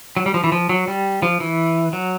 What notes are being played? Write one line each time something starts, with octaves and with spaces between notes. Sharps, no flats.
F#3
G3
F3
E3
F3
F#3
G3
F3
E3
F#3